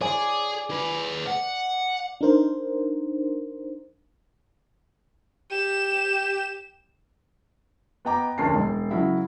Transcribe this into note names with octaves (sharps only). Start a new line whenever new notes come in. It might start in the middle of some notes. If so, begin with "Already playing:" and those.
G#4 D5 G#5
G#4 B4
F#5
D4 D#4 A#4 C5
G4 E7
B3 D#5 G5 A#5 D6
F1 D2 C#4 A#4 A5 C7
E1
C#3 F#3 E4